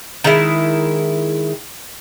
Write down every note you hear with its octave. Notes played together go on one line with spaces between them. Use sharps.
D#3 G#3 E4